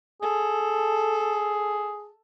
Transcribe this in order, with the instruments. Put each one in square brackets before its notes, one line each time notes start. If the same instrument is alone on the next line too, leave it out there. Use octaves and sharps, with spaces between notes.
[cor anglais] G#4 [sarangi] A4